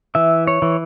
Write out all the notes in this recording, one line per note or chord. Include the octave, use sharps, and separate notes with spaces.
E3 E5
C#5
E3